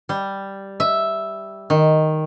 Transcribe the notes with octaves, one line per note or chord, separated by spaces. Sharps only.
G3
E5
D#3